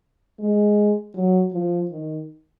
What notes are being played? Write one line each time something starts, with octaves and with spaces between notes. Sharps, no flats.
G#3
F#3
F3
D#3